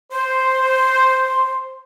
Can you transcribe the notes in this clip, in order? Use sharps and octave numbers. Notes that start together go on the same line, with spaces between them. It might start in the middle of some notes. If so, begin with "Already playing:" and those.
C5 C6